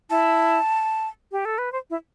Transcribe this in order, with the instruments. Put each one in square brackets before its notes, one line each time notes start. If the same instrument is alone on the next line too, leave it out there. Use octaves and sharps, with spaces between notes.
[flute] E4 [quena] A5
[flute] G4
A4
B4
C5
E4